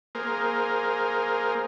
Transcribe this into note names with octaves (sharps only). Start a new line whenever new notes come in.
A#3 G#4 A#4 C5